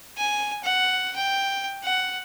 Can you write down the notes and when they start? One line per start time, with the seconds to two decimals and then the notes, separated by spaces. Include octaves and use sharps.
0.17 G#5
0.64 F#5
1.16 G5
1.84 F#5